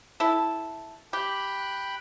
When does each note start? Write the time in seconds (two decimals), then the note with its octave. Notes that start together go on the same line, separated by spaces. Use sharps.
0.20 E4 A4
1.13 G4 G5 B5 F#6